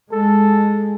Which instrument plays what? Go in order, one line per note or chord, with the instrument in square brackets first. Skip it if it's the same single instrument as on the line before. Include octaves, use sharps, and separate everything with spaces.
[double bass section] G#3 [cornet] A4